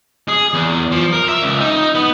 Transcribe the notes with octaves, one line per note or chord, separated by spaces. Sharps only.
G#4
E2
F3
A#4
E5
C#2
D#4
B3